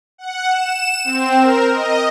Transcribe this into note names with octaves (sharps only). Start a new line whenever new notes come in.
F#5
E7
C4
A#4
D#5